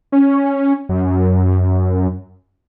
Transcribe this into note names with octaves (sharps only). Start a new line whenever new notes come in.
C#4
F#2